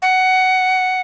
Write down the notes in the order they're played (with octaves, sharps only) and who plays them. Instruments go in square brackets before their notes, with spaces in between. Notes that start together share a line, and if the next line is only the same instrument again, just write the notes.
[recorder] F#5